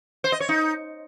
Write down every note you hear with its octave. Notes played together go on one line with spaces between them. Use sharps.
C5
D#5
C#5
D#4